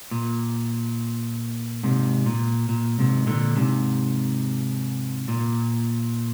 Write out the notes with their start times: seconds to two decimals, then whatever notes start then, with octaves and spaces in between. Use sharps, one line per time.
0.11 A#2
1.83 G#2 C3
2.26 A#2
2.69 A#2
2.99 G#2 C3
3.27 A#2 D3
3.56 G#2 C3
5.28 A#2